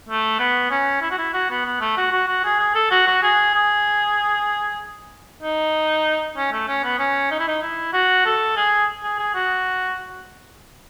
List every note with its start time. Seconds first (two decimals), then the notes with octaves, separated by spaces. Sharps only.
0.09 A3
0.39 B3
0.71 C#4
1.02 E4
1.11 F#4
1.18 E4
1.34 F#4
1.50 B3
1.66 B3
1.80 A3
1.97 F#4
2.12 F#4
2.28 F#4
2.44 G#4
2.59 G#4
2.75 A4
2.91 F#4
3.07 F#4
3.22 G#4
3.54 G#4
5.42 D#4
6.37 C#4
6.52 A3
6.68 C#4
6.84 B3
6.99 C#4
7.31 D#4
7.39 E4
7.48 D#4
7.62 E4
7.93 F#4
8.25 A4
8.57 G#4
9.03 G#4
9.19 G#4
9.35 F#4